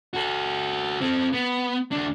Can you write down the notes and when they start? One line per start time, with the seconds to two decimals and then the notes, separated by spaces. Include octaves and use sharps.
0.14 F#4 A4
1.01 C4 A4
1.33 B3
1.92 D#2 D4